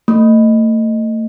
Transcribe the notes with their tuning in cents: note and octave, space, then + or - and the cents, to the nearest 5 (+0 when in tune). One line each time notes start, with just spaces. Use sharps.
A3 +35